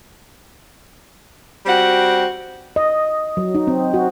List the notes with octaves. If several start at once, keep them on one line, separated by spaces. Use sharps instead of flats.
G3 C4 F#4 F#5
D#5
F#3
D#4
C4
F#4